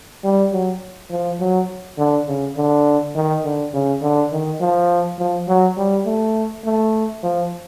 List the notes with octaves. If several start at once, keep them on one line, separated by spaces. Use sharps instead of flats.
G3
F#3
F3
F#3
D3
C#3
D3
D#3
D3
C#3
D3
D#3
F3
F3
F#3
G3
A3
A3
F3